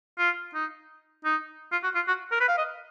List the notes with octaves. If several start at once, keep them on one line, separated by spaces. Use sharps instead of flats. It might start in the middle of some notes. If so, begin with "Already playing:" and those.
F4
D#4
D#4
F4
F#4
F4
F#4
A#4
B4
F5
D#5